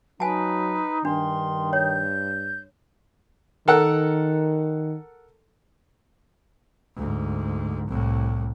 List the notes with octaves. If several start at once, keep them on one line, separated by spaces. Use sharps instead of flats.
F#3 D#4 B4 G#5 A5
G2 D#3 D4 C6
C#5 G6
D#3 A4 A#4 F#5
D2 G#2
C2 A2